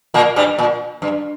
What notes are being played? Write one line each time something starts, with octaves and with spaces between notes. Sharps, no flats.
A#2 A#3
G2 G3
A#2
G2